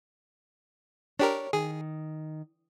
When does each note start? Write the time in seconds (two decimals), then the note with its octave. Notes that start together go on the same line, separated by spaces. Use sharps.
1.19 D4 G4 A#4 C#5
1.53 D#3 G#4